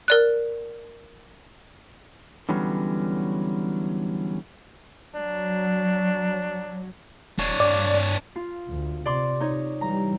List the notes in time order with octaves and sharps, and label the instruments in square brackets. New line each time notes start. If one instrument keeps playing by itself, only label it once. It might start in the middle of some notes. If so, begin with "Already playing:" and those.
[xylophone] A#4 D5 F#6
[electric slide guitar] D3 E3 F#3 G3 B3 C#4
[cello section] F#3 [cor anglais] D4
[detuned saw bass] E1 [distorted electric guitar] D4 C#5
[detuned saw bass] G2 [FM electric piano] D5
[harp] F4
[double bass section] D2
[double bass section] C3 [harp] D5 C6 D6
[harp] D#4 C#5
[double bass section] E3 G3 [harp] A#5